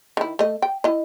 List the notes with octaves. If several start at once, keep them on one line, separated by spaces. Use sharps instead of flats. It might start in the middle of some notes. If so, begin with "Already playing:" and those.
D#3 E4
A3 D#5
G5
E4 D#5